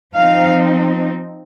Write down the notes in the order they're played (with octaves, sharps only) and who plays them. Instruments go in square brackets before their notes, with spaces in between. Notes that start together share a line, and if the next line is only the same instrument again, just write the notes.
[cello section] F3 C4 D#4 F5